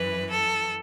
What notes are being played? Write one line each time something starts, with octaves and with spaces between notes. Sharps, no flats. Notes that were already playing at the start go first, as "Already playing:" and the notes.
Already playing: F#2 E3 B4
A4